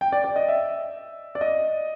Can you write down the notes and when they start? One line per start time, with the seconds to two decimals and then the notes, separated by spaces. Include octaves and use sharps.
0.01 G5
0.12 D5
0.24 D5
0.36 D#5
0.48 E5
1.35 D5
1.41 D#5